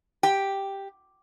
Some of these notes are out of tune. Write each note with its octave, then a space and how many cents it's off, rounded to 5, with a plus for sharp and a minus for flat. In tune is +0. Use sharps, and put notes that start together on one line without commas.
G4 +0 G5 +0